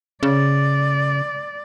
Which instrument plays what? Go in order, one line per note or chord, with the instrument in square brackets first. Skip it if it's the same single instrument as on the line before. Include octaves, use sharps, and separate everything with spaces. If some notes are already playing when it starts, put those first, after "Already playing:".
[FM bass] C#3 [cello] D5